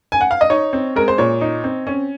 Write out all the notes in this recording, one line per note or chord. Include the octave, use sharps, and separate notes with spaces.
G#5
F#5
F5
D#5
D#4 C#5
C4
G#3 A#4
C5
A#2 C#5
D#4
C4
C#4